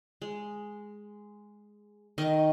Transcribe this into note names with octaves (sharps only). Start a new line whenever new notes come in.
G#3
D#3 D#5 C#6